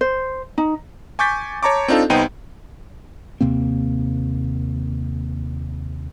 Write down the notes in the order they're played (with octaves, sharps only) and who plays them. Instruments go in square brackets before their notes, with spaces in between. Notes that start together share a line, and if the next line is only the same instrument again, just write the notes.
[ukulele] C5
D#4
[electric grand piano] G#5 C#6 D6 G6 A6 B6
C#5 A5 A#5 C#6 D6
C4 D4 D#4 F4 A4
C2 B3 D#4 C5 G5 D#7
[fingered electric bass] D#2 C3 A#3 C4